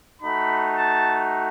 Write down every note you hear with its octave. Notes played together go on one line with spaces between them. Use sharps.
A3 D#4 F#4 B5
A5